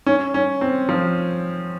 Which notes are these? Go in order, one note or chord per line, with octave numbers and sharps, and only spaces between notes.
C#4
C#4
C4
F3